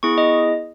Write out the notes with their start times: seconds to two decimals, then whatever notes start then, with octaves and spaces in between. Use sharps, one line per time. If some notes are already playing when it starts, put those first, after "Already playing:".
0.03 B3 E4 G#4 C#6
0.18 D#5